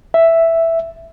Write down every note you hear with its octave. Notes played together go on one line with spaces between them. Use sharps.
E5